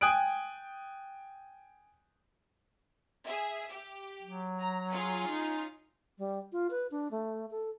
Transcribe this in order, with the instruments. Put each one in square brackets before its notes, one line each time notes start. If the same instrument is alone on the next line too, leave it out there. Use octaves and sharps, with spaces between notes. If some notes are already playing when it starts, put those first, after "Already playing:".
[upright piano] G5 G#5 D#6 F#6 D7
[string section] G#4 E5
G4
[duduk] F#3
[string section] A#5
C#4 F4 G#4
[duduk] D#4
[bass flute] G3
F4
B4
D4
A3
A4